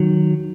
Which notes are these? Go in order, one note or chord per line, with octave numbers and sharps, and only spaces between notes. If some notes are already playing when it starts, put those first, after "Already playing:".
Already playing: D#3 F#3